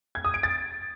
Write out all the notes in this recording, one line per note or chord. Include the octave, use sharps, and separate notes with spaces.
G#6
D#6
D7
A6